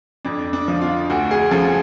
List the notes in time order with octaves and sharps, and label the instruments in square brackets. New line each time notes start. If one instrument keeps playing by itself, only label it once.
[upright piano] F2 D4
D4
D3 F3
F4
D2 F#4
G#4
C#3 F3 A4